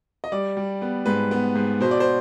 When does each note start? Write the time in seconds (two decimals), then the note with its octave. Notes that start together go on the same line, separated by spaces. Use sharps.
0.24 D#5
0.32 G3 D5
0.57 G3
0.82 B3
1.06 G#2 B4
1.31 B3
1.55 G#2
1.80 B2 C5
1.91 D5
2.00 C5